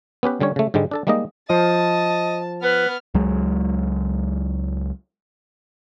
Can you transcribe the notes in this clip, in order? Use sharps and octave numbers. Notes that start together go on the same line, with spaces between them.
B3 C#4 G4 B4
D3 G3 C#4 C#5
C#3 A3
G#2 D3 G3 G#3
D4 A4 A5
G3 G#3 A#3 D#4 D#5
F3 D#5 A5
B3 B4 F6
C#2 F#3 G#3